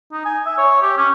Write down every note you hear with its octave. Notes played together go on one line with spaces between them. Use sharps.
D#4
G#5
E5
C#5
G4
C#4